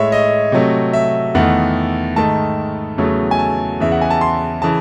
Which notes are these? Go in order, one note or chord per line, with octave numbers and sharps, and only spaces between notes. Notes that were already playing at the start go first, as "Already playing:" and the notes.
Already playing: A2 G#3 C#5 E5
D#5
C3 F#3 A3
E5
E2 D#3 A3 F#5
G#2 D#3 A3 A5
E2 C#3 F#3 A3
G#5
A5
E2 C#3 E3 E5
F#5
G#5
A5
C6
C#3 E3 A5